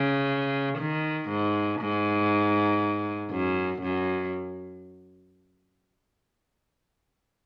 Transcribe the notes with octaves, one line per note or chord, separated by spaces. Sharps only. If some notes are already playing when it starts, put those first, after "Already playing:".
Already playing: C#3
D#3
G#2
G#2
F#2
F#2